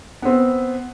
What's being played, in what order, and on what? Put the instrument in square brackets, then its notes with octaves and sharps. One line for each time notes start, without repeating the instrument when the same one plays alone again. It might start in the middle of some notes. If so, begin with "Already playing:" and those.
[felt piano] B3 C4